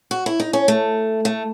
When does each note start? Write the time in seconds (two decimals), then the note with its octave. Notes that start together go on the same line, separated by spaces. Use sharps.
0.11 F#4
0.26 E4
0.40 D#4
0.53 C#4
0.68 A3
1.25 A3